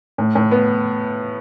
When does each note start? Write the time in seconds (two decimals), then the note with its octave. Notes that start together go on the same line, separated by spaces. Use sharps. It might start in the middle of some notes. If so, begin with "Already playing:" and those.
0.18 A2
0.35 A2
0.51 B3